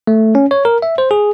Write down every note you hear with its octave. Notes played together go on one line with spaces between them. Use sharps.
A3
C#4
C#5
A#4
E5
C5
G#4